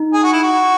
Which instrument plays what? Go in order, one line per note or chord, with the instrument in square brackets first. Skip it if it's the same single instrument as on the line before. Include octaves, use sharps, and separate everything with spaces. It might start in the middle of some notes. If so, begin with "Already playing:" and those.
Already playing: [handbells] D#4
[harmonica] G#4
F#4
E4
F#4